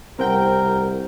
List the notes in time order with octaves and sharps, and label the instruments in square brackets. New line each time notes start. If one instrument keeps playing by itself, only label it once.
[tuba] C2 [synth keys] C4 G5 [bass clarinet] A#4 [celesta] C5 F#5